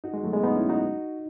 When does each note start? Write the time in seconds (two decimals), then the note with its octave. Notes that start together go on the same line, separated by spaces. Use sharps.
0.04 D#4 F#4
0.14 G#3
0.23 F#3 A3
0.33 G#3 B3
0.44 B3 D#4
0.56 C#4 E4
0.69 D#4 F#4